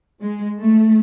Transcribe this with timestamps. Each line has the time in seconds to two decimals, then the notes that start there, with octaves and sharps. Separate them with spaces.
0.20 G#3
0.58 A3